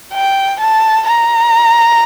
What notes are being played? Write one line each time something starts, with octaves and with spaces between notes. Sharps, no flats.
G5
A5
A#5